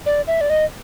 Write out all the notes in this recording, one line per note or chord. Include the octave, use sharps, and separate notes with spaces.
D5
E5
D5
D#5